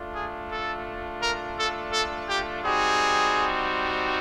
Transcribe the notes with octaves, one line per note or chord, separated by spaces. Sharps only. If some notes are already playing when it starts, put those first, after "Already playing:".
Already playing: A3 D4 F4
G#4
A4
A#4
A4
A4
G4
G3 C4 D#4 F#4 G#4